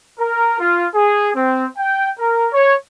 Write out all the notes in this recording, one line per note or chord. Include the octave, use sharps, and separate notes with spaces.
A#4
F4
G#4
C4
G5
A#4
C#5